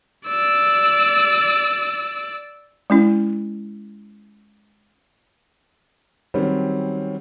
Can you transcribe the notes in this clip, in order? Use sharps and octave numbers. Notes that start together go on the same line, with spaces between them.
D5 E6
G#3 C#4 E4
D#3 F#3 G3 C4 C#4